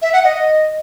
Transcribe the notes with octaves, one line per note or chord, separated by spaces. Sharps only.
E5
F#5
D#5